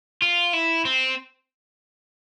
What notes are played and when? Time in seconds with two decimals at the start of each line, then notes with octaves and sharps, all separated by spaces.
0.22 F4
0.53 E4
0.85 C4